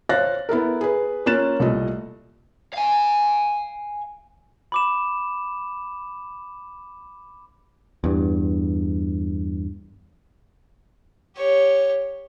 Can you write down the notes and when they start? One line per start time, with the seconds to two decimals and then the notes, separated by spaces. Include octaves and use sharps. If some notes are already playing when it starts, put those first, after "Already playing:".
0.09 C5 C#5 F5 F#6 A6 A#6
0.49 B3 E4 A4 A#4
0.81 G#4 B4
1.26 A#3 C#4 F4 F#6 A6 E7
1.59 C2 A#2 A3 D#5
2.74 F5 G#5
4.72 B5 D6 E7
8.04 E2 G2
11.36 G4 C#5